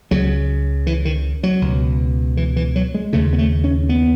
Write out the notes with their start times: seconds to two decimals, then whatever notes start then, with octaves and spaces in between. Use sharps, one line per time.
0.11 C#2 C#3 F#3
0.87 E3
1.05 D#3
1.43 F#3
1.62 C#2 B2
2.37 E3
2.56 E3
2.76 F#3
2.94 G#3
3.13 D#2 C#3 A3
3.33 B3
3.38 A3
3.64 C#4
3.89 B3